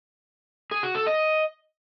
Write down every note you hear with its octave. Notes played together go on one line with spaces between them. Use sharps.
G#4
F#4
A4
D#5